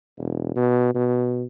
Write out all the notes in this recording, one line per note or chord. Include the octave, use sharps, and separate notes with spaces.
E1
B2
B2